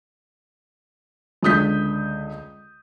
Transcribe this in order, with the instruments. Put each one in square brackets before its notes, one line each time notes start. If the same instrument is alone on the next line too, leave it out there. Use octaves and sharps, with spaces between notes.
[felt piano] C#2 D3 D#6 G6 B6